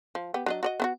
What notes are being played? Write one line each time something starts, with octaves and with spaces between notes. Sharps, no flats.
F3
B3 G4
F#3 D4 D#5
F#4 D5 D#5
B3 E4 F#4